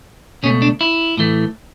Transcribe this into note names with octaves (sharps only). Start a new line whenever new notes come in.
C#2 B2 A3 C#4
D4
E4
A2 E3 A3